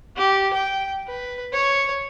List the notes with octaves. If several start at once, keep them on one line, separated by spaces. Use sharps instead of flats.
G4
G5
B4
C#5